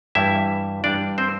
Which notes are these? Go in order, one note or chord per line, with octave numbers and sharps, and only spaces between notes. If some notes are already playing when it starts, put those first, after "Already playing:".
G2 E3 G3 E4 E5
G2 E3 G3 D4 D5
C4 C5